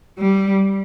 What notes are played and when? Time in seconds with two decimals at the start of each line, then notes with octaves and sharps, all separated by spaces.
0.19 G3